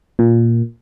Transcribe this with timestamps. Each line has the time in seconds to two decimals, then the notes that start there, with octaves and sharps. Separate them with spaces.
0.19 A#2